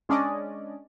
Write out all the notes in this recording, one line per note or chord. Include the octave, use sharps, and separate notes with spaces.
G#3 C#4 D4 D5 D#5